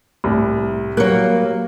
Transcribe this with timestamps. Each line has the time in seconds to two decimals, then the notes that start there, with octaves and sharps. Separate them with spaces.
0.24 C2 A2
0.97 F#3 G3 A#3 F#6